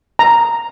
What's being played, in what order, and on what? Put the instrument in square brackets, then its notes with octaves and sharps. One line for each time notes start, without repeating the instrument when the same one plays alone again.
[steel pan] A#5